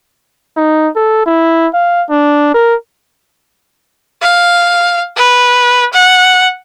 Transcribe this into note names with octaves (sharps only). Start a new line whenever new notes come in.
D#4
A4
E4
F5
D4
A#4
F5
B4
F#5